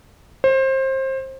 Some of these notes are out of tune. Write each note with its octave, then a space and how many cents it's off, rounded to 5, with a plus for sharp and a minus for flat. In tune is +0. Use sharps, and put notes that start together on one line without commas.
C5 +25